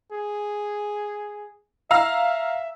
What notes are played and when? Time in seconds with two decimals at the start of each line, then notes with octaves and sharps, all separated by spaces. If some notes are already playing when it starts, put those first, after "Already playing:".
0.12 G#4
1.91 E5 F5 A#5 E6